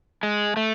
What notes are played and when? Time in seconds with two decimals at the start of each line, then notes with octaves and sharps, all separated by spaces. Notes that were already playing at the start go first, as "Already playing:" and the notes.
0.23 G#3
0.57 A3